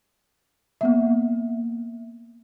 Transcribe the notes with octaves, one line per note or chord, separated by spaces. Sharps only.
A#3 B3 E5